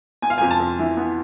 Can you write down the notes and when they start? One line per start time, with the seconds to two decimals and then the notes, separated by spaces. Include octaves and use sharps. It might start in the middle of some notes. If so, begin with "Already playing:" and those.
0.22 B3 G#5
0.30 F5
0.38 F2 G#5
0.51 A5
0.60 F2
0.79 E3
0.97 B3